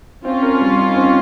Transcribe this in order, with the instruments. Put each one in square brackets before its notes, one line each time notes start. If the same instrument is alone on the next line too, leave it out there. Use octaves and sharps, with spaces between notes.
[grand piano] C4 [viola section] C#4 F4
[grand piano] A#4
G3
D#4
C4